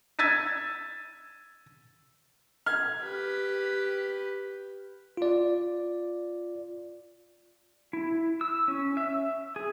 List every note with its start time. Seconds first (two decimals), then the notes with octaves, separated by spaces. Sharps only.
0.19 E6 G#6 A6 B6 D#7
2.66 F6 G#6
3.02 G4 B4
5.17 F4 D5
7.93 E4
8.41 E6
8.68 C#4
8.97 E5
9.56 G#4